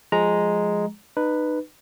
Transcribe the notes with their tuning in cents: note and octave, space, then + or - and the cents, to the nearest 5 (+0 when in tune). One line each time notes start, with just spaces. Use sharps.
F3 +15 G#3 +0 A#5 +0
D#4 -30 B4 +0